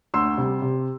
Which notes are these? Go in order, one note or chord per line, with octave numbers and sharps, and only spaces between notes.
D2 C6 E6
C3 G3
C3